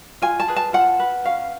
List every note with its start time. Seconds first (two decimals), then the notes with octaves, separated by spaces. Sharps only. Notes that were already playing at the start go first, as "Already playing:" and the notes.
0.22 F4 G#5
0.40 A5
0.48 G#4 B4
0.56 A5
0.73 F4 F#5
0.99 B4
1.25 C#4 F5